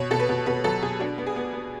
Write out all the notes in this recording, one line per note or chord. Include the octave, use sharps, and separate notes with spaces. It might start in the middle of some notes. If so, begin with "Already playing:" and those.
Already playing: B2 C#5
B2 A4
B4
B2
B2 B4
F#3 A4
B2 G#4
D4 F#4
B3
G#4
B3
B3